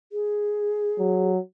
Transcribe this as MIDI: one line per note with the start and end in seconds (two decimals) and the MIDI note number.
0.12 1.31 68
0.99 1.38 54